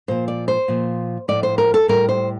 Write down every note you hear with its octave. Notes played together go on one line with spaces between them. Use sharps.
A#2 F3 C5
D5
C5
A#2 F3
A2 F3 D5
C5
A#4
A4
A2 G3 A#4
C5